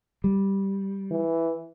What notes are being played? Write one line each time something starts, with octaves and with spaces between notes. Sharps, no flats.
G3
E3